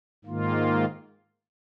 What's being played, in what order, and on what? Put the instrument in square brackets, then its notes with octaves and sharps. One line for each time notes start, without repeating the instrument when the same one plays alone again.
[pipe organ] G#2 D#3 A#3 F4